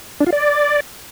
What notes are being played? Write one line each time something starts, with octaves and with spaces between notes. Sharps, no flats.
D4
F4
D5